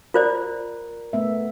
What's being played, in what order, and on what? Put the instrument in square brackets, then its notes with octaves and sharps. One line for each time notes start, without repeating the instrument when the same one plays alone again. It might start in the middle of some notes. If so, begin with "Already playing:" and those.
[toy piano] F4 C5 D5 [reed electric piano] A#4
[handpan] A3 B3 E5